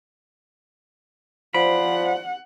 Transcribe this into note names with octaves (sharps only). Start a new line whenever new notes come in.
F3 C5 D5 F#5 B5